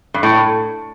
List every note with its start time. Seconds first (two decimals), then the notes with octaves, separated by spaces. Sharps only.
0.14 G2
0.23 A2